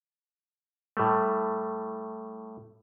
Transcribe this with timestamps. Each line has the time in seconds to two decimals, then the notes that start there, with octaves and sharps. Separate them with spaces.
0.97 A2 G3 A3